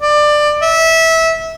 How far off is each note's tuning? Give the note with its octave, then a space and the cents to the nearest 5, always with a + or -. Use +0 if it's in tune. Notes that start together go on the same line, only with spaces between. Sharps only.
D5 +20
E5 -20